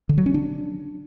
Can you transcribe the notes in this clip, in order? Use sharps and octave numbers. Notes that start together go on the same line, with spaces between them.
D3
F#3
C#4
D4